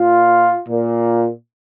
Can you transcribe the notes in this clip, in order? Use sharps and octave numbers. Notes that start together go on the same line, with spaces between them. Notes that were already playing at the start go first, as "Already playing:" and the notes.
Already playing: A#2 F4
A#2